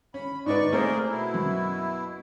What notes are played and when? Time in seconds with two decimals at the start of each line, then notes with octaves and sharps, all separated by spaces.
0.14 C#4 B5
0.46 G#2 D#4 B4 D5 C#6
0.72 A3 A#3 C4 G#4 A#4 C5
1.09 B2 E4
1.34 F#2